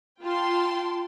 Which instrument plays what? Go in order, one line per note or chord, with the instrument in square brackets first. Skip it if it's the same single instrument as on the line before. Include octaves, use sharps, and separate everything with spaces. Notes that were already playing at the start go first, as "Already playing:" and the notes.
[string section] F4 G5 A5 C6